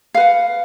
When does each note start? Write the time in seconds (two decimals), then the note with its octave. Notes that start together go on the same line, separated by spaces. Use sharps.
0.14 F5
0.17 B4
0.20 F#5